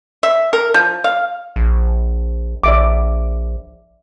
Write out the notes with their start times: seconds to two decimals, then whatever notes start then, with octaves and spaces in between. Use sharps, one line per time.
0.23 E5
0.53 A#4
0.74 F3
1.04 F5
1.56 A#1
2.63 A#1 D5 E5 D6